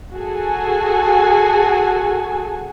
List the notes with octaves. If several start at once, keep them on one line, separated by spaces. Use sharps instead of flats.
F#4 G#4 A4 G#5